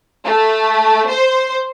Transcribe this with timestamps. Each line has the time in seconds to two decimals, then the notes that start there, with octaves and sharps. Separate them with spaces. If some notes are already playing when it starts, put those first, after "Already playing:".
0.24 A3
1.07 C5